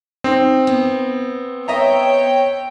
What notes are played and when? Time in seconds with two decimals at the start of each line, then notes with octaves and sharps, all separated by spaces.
0.24 C4 D#4
0.67 B3
1.68 C#5 D#5 E5 G5 A#5